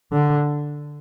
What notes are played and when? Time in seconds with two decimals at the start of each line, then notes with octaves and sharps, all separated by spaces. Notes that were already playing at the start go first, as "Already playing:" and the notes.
0.12 D3